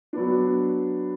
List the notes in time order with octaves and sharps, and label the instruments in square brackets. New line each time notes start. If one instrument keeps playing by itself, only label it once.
[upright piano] F#3 B3 D4